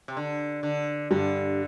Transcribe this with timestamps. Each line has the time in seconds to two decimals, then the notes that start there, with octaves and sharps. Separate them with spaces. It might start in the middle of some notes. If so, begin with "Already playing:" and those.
0.08 C3
0.17 D3
0.63 D3
1.11 G2 D3 G3